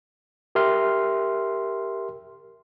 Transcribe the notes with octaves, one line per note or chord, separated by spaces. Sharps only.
G4 A#4 E5 C6 F6